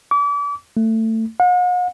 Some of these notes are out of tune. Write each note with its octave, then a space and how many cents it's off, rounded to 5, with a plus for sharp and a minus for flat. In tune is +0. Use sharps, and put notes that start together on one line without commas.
D6 -35
A3 +20
F#5 -45